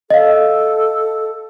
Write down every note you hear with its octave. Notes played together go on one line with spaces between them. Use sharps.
A4 D#5 F5